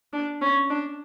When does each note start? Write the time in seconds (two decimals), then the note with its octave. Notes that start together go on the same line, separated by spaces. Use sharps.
0.13 D4
0.41 C#4
0.70 D4